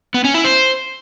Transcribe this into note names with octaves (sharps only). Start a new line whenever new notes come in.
B3
C#4
E4
C5